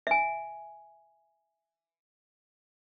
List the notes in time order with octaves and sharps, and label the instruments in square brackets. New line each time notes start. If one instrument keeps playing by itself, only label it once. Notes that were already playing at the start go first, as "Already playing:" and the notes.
[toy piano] E5 G#5